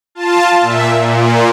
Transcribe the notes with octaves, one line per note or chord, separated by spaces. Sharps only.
F4 A5
A#2 E5
A#2